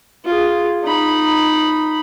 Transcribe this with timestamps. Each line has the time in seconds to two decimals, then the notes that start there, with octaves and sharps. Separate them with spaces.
0.25 F4 G#4
0.83 D#4 B5